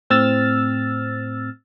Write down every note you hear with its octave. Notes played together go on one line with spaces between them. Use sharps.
A2 C4 E6 F6 A6